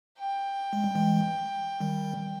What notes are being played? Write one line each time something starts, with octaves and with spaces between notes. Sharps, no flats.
G5
G#3
G3
E3 G#3
D#3 G3